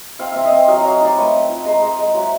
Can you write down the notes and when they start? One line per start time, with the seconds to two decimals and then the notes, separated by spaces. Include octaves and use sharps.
0.19 C4 F5
0.32 C4 E5
0.45 D#5 F5
0.52 C4
0.68 F#3 D#5 F5
0.80 F#3 D#5 F5
1.01 D#4 C5 D5
1.17 A3 B4 C#5
1.34 C4
1.49 F4
1.66 G#3 A#4 C5
1.82 G#3
1.99 G#3
2.14 F#3 E5 F#5